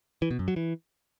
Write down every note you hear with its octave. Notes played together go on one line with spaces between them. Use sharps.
E3
B2
F#2
F#3
E3